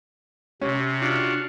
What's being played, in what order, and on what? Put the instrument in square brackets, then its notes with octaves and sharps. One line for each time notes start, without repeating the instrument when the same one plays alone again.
[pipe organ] C3 [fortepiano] C#4
[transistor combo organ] D4 F4 F#4